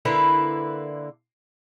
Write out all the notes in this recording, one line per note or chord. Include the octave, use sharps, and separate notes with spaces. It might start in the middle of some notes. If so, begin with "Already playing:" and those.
D3 A#3 E4 B4